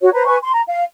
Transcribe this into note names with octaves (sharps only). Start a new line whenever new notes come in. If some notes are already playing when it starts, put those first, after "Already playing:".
F#4 C#5
B4 C5 A#5
B4 G#5 C#6
C6
A#5
F5